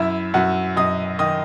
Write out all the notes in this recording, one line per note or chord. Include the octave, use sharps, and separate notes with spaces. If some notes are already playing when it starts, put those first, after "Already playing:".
Already playing: F#2 E4 E5
F#2 F#4 F#5
F#2 D#5 D#6
D#3 D#5 D#6